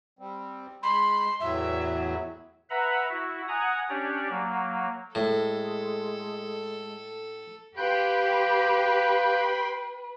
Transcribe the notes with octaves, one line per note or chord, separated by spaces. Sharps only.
G3 C4
G#3 B5 C6
E2 A2 F#3 E5
B4 E5 F#5 A#5 B5
E4 F#4
F#5 G#5 A#5 D#6
C#4 D4 G4 C#5 D5
F#3 A#3
A2 G#3 A4
G4 B4 F5 G5 B5 C6 F#6 G6